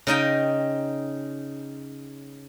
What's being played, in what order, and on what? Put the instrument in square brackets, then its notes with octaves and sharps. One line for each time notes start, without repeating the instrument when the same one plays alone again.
[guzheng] C#3 D#4 D#5 G5